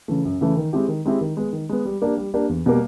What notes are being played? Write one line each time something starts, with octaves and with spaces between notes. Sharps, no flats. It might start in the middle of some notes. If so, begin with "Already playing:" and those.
C#3 E3 A3
F#2
C#3 E3 A3
D#3
G#3 C4 E4 G4
D#3
G#3 C4 E4 G4
D#3
G#3 B3
D#3
G#3 B3
G3
A#3 D4 G4
G3
A#3 D4 G4
E2
B2 G3 A#3